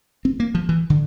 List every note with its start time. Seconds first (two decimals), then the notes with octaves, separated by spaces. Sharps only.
0.25 C4
0.40 A#3
0.55 F3
0.69 E3
0.90 D3